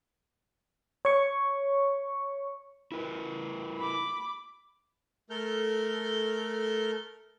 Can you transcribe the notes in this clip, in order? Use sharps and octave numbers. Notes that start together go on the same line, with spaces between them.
C#5 C#6
E4 A#4 B4
B5 D6
A3 A4 A#4 F6 G6